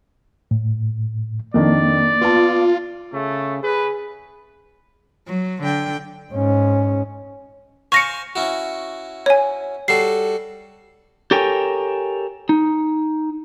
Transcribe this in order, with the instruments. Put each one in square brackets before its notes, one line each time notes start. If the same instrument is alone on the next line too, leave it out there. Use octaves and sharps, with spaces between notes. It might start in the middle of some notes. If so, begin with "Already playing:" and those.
[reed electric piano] A2
[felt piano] F2 D#3 D4 [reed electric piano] A#3 [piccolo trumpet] D5
[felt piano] B3 A5 [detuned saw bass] F4
[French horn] C#3 [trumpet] A3
[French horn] G#4 [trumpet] B4
[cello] F#3
D3 G5
[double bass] G#2 C#4
[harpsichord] C5 F5 G#5 [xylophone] C#6 A#6 C#7
[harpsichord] C#4 E4 F#4
[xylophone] C#5 G#5
[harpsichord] G3 F#4 A4 [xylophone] C7
[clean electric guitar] G4 A4 A#4 C#5 G5 G#5
D#4